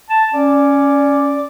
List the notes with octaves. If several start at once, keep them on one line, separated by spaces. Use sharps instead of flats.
A5
C#4 D5